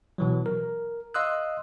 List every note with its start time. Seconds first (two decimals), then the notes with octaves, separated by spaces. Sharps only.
0.18 B2 E3 F#3
0.46 A#4
1.14 D#5 F5 C6 D#6 E6 F#6